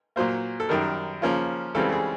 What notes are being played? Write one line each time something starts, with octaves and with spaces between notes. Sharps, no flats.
A#2 F#3 A#3 C5
A4
F#2 D#3 G3 A#4
C#3 F3 A#3 C#4 F4
C#2 C#3 E3 G3 C4 A4
G#4